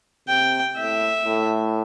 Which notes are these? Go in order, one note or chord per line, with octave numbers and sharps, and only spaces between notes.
C3 G5
A2 E5
A2